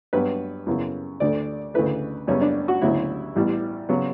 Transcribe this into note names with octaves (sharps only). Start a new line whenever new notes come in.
G2 F#3 B3 B4
F#2 C#3 E3 B3
D2 D3 A3 D5
D2 C#3 E3 A3 B4
F#2 C#3 G3 B3 C#4
D4
F#4
D2 C#3 F#3 B3 E4
A1 A2 E3 G3 B3
C#3 F#3 B3